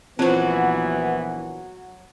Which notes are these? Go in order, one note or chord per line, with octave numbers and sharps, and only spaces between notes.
A#1 E3 F#3 B3 C4 F4 F#4 C5